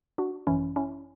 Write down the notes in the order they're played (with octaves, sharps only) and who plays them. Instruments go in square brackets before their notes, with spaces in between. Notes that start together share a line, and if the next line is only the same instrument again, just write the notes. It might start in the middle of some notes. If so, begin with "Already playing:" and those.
[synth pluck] D4 F#4
G#1 F#2 E3 C#4 E4
C#4 E4